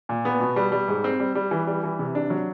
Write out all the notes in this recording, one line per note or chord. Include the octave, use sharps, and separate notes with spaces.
A#2
B3
B2
G3
G3
G#2
C4
G3
G3
E3
G3
E3
C3
D4
F#3